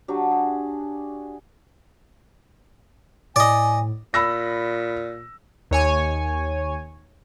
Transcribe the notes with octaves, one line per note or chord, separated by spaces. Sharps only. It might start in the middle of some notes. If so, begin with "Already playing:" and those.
F#3 D4 F#4 G4
G#4
A2 D5 D#5 G#5
A#2 B5 E6 A#6
D#2 C#5 G#5